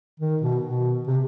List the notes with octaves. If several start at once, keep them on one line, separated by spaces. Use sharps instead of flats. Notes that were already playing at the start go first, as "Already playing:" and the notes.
D#3
B2
B2
C3